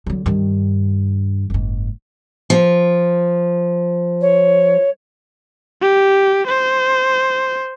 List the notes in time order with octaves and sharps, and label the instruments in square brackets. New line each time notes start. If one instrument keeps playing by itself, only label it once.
[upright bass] D3 F#3
G2 D#3
F#1 G#2
[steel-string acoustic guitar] F3
[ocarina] C#5
[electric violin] G4
C5